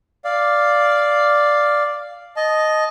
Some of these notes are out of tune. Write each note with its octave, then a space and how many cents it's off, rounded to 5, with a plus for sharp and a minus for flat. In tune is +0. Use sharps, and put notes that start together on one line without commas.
D5 +0 F5 +0
D#5 +0 A5 -20